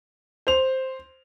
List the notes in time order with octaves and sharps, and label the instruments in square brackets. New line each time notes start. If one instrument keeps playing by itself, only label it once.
[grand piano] C5 F7